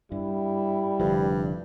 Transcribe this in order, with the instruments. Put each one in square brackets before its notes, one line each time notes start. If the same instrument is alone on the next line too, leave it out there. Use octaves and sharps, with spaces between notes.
[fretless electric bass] G2 [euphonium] G3 [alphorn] E4
[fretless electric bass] F1 D3 F3 [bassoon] G2